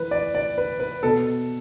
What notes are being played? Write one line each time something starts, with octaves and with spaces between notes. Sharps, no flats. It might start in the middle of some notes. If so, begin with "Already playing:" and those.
Already playing: E3 B4
D5
D5
B4
B4
B2 A4